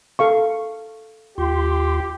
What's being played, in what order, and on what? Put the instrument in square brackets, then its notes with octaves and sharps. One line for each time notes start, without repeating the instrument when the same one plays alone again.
[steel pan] A4 F5 C#6
[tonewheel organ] D#2 F4 C6 [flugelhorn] G4